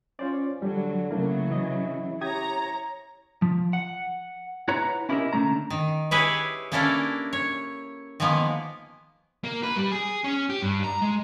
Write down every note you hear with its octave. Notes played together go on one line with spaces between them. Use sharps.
C#4 F4 C5 D5
D3 F#3 G3
C#3 F#3 A3 A#3 E4 A#4
E3 D#5
G4 C#5 A#5 D#6 G#6
F3
F#5
E4 B4 C#5 F#5 A#5
C#4 E4 G4 A#4 D#5 E5
D3 A3 C#4 A#5
D#3
E4 G4 G#4 B4 C#5 E5
A#3 C#4 D4 E4 A4 A#4
C#5
D#3 F3 G#3 A#3 B3
A#3
B4
G3
G#4
C#4
G4
G2
A#5
G#3